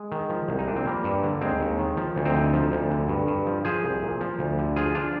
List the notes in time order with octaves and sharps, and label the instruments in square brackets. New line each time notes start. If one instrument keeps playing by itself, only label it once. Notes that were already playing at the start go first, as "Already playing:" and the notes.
Already playing: [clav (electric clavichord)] G#3
D#3
F3
C2
D#4
A#2 D4
C4
F3 G3 A#3
G2
D3
D#2 G#3 C4
D#2
D#3
F3
D2
C4 D#4
D3
F3
D2
D3
G2
G2
F3
F3 G#4 C5
C2
A#2
F3
D2
D3
F3 F4 G#4
D4 F4